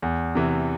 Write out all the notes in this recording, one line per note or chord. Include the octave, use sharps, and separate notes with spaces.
E2
C3 E3